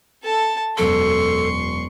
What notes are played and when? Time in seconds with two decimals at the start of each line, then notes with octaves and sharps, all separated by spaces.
0.23 A4 A5
0.78 E1 F#2 A4 C6 C#6 D7